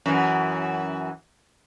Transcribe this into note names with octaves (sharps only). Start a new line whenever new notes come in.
F#2 E3